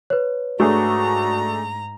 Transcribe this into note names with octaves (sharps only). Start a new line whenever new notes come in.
B4 C#5
G#2 A3 D4 F#4 G#4 A#5